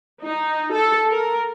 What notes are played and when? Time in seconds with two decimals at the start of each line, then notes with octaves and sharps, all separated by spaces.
0.23 D#4
0.73 A4
1.10 A#4